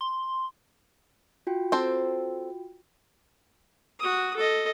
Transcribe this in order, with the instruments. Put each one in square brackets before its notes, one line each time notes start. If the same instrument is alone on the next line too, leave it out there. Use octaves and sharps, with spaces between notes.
[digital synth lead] C6
[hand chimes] F4 F#4 G5
[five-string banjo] C4 A4 C5
[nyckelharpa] F#4 D#6
A4 D#5